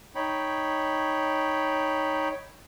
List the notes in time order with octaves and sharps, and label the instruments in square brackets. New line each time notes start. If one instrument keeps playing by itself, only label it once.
[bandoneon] D#4 C#5 G5 B5